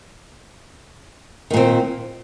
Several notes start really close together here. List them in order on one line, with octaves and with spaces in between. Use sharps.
D#3 A#2 C4